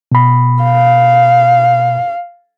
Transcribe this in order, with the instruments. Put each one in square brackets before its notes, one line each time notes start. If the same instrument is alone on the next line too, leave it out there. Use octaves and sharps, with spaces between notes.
[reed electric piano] B2 B5
[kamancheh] F5